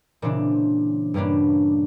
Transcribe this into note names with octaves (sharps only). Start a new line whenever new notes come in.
A#2 C#3 E3 C4 D4
G2 G3 A#3 C#4 D4